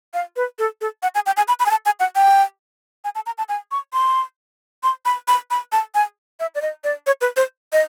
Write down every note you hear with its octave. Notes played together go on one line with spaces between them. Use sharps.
F5
B4
A4
A4
F#5
G#5
G5
G#5
B5
B5
G#5
A5
G#5
F#5
G5
G#5
A5
A#5
A5
G#5
C#6
C6
C6
B5
B5
B5
A5
G#5
E5
D5
D#5
D5
C#5
B4
C5
D#5